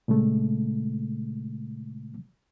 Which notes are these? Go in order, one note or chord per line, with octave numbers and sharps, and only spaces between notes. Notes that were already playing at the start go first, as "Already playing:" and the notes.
A#2 C#3 G#3 A3